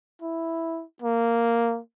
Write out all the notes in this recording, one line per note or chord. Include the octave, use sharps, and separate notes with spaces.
E4
A#3